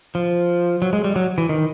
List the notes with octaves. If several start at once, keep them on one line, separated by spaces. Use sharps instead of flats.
F3
F#3
G#3
G3
F#3
E3
D#3